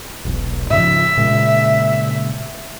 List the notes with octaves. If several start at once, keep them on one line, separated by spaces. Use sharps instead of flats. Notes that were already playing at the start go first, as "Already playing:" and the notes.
E1 B1
G#2 C#3 F3 E5
A#2 C#3 G#3